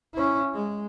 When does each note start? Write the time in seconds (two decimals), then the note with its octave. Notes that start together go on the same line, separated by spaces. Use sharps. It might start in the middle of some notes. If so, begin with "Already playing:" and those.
0.14 C#4 E4
0.54 G#3